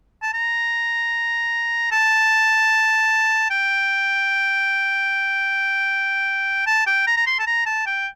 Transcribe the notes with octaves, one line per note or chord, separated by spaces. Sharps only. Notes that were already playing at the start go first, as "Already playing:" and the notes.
A5
A#5
A5
G5
A5
G5
A#5
A#5
C6
A5
A#5
A5
G5